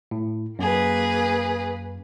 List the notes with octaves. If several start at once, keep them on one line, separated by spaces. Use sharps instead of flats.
A2
F#2 A#3 G#4 B4